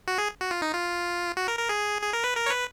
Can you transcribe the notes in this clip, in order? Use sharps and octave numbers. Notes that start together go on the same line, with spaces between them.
F#4
G#4
F#4
F4
D#4
F4
F#4
A#4
A#4
G#4
G#4
A#4
B4
A#4
C#5
B4